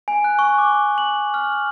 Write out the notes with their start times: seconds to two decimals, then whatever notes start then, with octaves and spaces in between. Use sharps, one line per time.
0.08 G#5
0.24 F#6
0.39 C#6
0.58 D6
0.98 F#7
1.34 F6